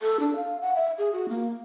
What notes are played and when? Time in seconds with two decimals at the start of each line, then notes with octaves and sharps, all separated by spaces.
0.02 A4
0.20 D4
0.36 F5
0.62 F#5
0.75 E5
0.98 G#4
1.13 F#4
1.29 A#3